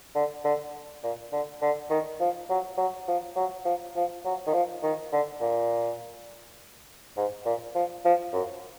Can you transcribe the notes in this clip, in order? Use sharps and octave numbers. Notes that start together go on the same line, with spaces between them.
D3
D3
A#2
D3
D3
D#3
F3
F#3
F#3
F3
F#3
F3
F3
F#3
D#3
F3
D#3
D3
A#2
G#2
A#2
F3
F3
F#2